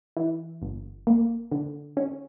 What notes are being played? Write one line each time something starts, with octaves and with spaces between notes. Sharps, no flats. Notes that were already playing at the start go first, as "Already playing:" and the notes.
E3
G1
A#3
D3
C#4